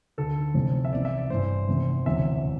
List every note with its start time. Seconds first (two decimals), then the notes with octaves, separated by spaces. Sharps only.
0.18 D2 D3 A4
0.54 F1 F2 E3
0.85 E5
0.92 C2 C3 E3 D5
1.05 E5
1.18 D5
1.30 A1 G2 E3 C5
1.69 F1 E2 C3 E3
2.05 E1 D2 C3 E3 E5